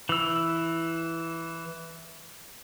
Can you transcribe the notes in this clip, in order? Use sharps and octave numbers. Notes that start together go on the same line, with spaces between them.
E3 E6